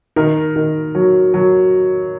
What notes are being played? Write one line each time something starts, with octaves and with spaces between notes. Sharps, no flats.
D#3 A#4
D#3
F#3
F#3